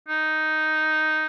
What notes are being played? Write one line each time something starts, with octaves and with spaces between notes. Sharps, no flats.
D#4